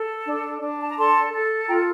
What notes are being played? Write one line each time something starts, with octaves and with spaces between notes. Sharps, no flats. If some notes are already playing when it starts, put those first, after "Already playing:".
Already playing: A4
D4
D4
A5
A#5
A4 A5 C6
A4
F4 G5 A#5